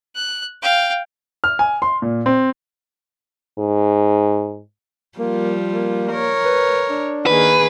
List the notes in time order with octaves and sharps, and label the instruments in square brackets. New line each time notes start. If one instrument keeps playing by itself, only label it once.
[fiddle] F#6
F5 G5
[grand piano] F6
G#5
C6
A#2
C4
[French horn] G#2
[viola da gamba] F3 G3 F4 [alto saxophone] A#3
[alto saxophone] A#3
[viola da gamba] A#4 C#5
[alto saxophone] B4
D4
[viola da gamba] D#3 A#3 G#4 [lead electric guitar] B4